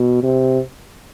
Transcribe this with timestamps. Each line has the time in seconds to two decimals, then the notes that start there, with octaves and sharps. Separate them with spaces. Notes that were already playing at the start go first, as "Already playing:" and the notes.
Already playing: B2
0.23 C3